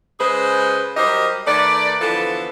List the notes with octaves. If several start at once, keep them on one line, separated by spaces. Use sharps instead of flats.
C#3 G#3 G#4 B4 C5
F#3 G3 G4 A#4 C5 D#5
D#3 A3 B4 D5
D3 E3 F3 B3 A4